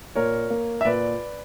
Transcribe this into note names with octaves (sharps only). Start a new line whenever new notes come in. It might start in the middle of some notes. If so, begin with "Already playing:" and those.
A#2 A#4 C#5
A#3
E5
A#2 B4 D5